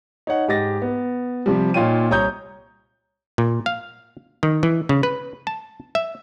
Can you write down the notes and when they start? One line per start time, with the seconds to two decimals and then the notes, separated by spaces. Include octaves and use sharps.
0.27 D#4 C#5 F#5
0.48 G#2 G4 D#5 A6 A#6
0.82 B3
1.46 C3 F3 G3
1.74 A#2 D#4 F4 C#5 G5 D#7
2.10 C2 C#5 A#5 D#6 G6
3.38 A#2
3.66 F5
4.43 D#3
4.63 E3
4.89 C#3
5.03 B4
5.47 A5
5.95 E5